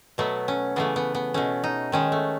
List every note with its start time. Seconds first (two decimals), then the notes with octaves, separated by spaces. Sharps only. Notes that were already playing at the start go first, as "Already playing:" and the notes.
0.18 B2 F#3 A3 B3
0.48 C#4
0.76 C#3 E3 A3 B3
0.96 B3
1.15 B3
1.34 B2 A3 C#4
1.64 D#4
1.92 D#3 G#3 C#4
2.12 A3